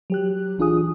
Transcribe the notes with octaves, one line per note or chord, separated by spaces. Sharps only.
F#3 G4 F#6
A#1 E3 D4 F4 G#4 D#6